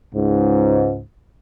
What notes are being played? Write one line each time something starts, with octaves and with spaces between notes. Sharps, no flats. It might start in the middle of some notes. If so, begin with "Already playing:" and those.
C#2 G#2